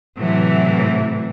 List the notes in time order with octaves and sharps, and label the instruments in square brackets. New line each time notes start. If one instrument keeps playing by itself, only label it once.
[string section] A2 C3 E3 F#3